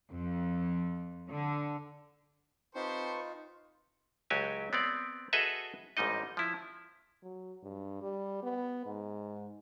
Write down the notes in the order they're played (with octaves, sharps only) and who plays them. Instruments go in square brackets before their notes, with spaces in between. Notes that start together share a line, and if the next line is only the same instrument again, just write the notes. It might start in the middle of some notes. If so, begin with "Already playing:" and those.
[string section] F2
D3
[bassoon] C4 [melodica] D#4 F4 [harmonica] G4 A4 C5 [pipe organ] B4 C#6
[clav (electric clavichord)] C#2 F#3 F#4 G4 G#5
B3 C4 D5
F#4 G#4 A4 B4 D#5 E5
A1 G#2 G3 D#4 D#5
F3 E4
[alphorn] F#3
G2
G3
B3
G#2